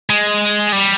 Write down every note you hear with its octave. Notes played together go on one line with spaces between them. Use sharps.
G#3
G3